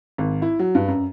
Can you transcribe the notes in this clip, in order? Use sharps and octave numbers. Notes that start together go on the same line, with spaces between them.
G#1
E4
F#3
G2
F#2